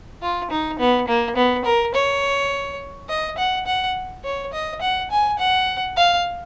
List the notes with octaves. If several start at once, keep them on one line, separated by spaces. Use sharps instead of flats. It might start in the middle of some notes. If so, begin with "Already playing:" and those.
F4
D#4
B3
A#3
B3
A#4
C#5
D#5
F#5
F#5
C#5
D#5
F#5
G#5
F#5
F5